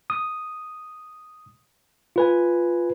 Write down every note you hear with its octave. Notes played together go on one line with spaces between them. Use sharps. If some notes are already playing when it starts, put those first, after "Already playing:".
D#6
F4 B4 G#5